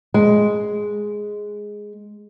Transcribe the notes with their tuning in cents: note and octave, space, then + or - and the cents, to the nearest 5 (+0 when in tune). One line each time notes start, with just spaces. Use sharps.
G#3 +0